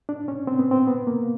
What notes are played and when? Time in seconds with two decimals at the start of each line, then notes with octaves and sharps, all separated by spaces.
0.09 D4
0.28 C#4
0.47 C4
0.59 B3
0.71 C4
0.87 B3
1.07 A#3